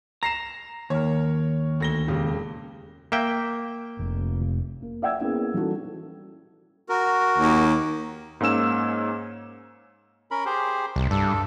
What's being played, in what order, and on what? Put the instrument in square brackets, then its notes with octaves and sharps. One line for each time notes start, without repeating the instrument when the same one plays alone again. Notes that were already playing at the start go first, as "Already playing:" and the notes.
[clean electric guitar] A#5 [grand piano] A#6 C7 E7
[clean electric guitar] D#2 [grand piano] A#4 C#5
[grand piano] D2 A#6 G7
E1 C#3 G4
[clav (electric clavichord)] A#3 E5 G5
[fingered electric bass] F1
[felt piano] A#3
D5 E5 F#5 G5 E6 G#6
A#3 B3 C#4 E4 G#4
E3 G3 C#4 D#4 F#4 A4
[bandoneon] F#4 A#4
[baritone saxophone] D#2
[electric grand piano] G#2 A#3 C#4 E6 E7
[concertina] C#4 A#4 B5
G4 G#4 C5
[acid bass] C2
[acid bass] G2 [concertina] A4